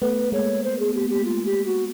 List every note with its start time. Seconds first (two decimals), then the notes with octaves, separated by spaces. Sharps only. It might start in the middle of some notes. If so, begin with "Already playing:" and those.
0.02 A3 B3 B4
0.32 G#3 A#3 C#5
0.64 C5
0.79 G#4
0.94 G4
1.10 G4
1.25 F4
1.46 G4
1.66 F#4